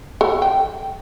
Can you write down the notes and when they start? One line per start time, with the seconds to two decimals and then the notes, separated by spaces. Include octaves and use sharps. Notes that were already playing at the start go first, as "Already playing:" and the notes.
0.21 A4
0.42 G5